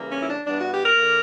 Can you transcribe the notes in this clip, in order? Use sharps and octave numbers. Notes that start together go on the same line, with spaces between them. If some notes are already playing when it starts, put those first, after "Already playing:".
Already playing: C#3 E3 G3 A#3
C#4
E4
D4
G2 E3 G3 B3 D4
F#4
G4
A#4
D3 A#3